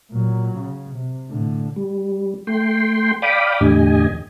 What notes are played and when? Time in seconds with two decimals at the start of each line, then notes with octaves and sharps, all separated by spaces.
0.12 A#2 F#3
0.57 C#3
0.95 C3
1.30 A2 D3
1.76 G3
2.47 A3 G5 C6
3.22 D5 F5 G5 B5 D6 D#6
3.60 E2 A2 D3 G4 D#5 G#5